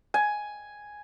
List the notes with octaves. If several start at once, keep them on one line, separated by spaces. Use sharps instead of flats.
G#5